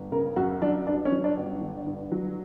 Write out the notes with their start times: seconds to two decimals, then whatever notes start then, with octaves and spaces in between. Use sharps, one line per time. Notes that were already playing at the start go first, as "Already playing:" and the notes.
Already playing: G1
0.12 C#3 A#4
0.36 F#2 F#4
0.62 F#3 D4
0.87 G2 D4
1.05 C#4
1.12 F#3
1.24 D4
1.37 G1
1.61 D3
1.86 G2
2.12 F#3